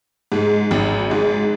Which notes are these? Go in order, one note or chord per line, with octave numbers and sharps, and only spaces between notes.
G#2 G#3
G#1
G#2 G#3